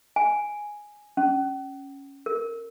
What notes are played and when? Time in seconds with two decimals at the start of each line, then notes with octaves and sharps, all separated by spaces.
0.16 G#5
1.17 C#4
2.26 A#4